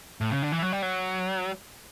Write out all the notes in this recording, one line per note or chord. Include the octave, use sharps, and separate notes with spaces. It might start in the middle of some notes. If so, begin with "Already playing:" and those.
A2
C#3
D3
E3
F#3
G3
F#3